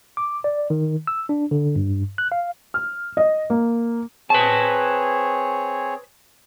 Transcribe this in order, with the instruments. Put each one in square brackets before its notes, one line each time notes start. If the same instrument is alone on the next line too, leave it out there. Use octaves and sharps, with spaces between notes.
[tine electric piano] D6
D5
D#3
E6
D4
D3
G2
F#6
F5
[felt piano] F6
D#5
A#3
[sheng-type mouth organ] C4 G#4 C#5 [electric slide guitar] B4 A5